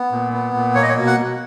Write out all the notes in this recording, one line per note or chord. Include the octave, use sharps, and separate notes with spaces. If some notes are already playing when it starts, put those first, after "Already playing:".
Already playing: B3
A#2
B3
A#2
A#3 C#5
D#5
C#5
B2
F#5
B2